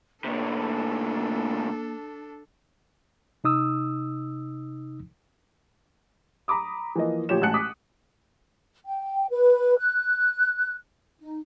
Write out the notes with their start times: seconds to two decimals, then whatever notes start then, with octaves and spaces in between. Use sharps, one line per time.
0.24 A2 C3 A#3 D4 A4
3.44 C3 D#4 D#6 E6
6.48 A#5 B5 D6 D#6
6.96 E3 F3 A#3 D#5
7.29 D2 A#2 F3 G4 C#5 E7
7.41 A1 G#3 F#4 A5 F#6 C#7
7.54 D6 D#6 B6
8.84 G5
9.30 B4
9.77 F#6
11.19 D#4